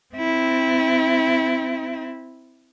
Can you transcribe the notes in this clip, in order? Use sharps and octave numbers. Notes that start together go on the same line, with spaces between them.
C4 E4